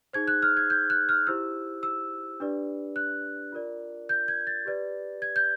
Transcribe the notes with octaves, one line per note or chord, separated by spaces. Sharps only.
D#4 G#4 C5 G#6
F#6
F6
G#6
G6
F#6
F6
E4 G4 C5 E6
E6
D4 G4 B4 D5
F#6
F4 A#4 D5
G6
G#6
A6
G4 B4 D5
G#6
G6